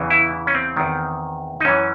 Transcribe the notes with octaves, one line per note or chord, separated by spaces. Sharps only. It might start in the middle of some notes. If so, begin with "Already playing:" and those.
Already playing: E2 C#3 E3
E4
C#4
C4
E2 D#3
D#4
F#2 E3 C#4